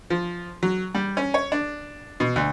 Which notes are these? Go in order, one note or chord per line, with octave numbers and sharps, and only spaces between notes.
F3
F#3
G3
C#4
C#5
D4
B2
D2